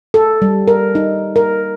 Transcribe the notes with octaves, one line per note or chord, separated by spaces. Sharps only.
A4
G3
A#4
D#4
A#4